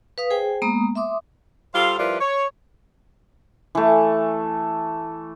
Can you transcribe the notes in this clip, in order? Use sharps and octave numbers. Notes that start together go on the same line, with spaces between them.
B4 F5 D#6
G#4 C5 G5 G#5
G#3 A#3 B3 A#5 D#6
E5 C6 D6 D#6
G3 F4 A4 C5 F5
F3 G3 E4 F4 A#4 B4
C#5
E3 A3